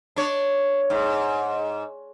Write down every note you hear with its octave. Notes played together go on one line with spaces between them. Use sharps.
D4 C#5
G#2